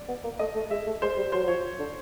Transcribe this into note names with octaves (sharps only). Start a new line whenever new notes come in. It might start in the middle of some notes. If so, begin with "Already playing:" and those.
Already playing: D5
B3
A#3
A3 D#5
A3
G#3 E5
A3
G#3 C5
G3
F#3 C5
F#3
F3 C#5
D3